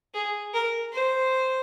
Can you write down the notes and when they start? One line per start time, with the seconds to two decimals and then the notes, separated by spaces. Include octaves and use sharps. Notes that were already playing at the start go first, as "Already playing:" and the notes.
0.14 G#4
0.54 A#4
0.93 C5